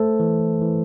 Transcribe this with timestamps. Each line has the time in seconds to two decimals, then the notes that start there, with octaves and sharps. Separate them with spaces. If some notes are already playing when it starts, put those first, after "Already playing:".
Already playing: A3 A4 C5
0.20 E3
0.61 E3